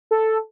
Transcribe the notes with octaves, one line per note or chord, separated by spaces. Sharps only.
A4